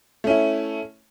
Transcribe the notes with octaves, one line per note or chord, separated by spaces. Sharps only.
A3 C#4 E4